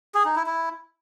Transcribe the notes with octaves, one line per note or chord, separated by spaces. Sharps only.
G#4
D#4
E4
E4